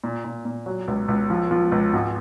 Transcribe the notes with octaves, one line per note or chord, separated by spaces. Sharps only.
A#2
A#2
A#2
F#3
C#2
C#2
F3
F3
C#2
G#1